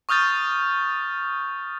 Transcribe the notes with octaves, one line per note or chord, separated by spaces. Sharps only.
C#6 D#6 F6 G6 A6